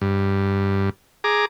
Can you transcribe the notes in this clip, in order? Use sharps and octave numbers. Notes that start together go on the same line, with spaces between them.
G2
G#4 A#5 D6